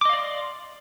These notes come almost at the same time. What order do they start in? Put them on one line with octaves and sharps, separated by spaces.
D6 D#5 F5 D5 C6